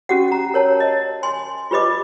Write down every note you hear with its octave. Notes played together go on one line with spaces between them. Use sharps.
C#4 F#4 G4 F#5
F#5 A#5
A#4 C#5 A5
D#5
G#5 C6
F4 G4 B4 D#5 D6